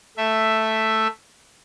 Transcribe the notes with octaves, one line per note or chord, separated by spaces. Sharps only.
A3 E5